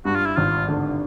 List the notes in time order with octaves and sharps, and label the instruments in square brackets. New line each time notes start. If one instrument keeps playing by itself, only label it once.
[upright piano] G2 [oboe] F#4
[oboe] F4
E4
[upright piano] G#1 [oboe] F4
[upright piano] D3